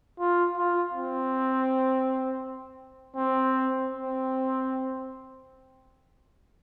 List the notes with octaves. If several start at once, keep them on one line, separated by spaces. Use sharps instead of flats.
F4
F4
C4
C4
C4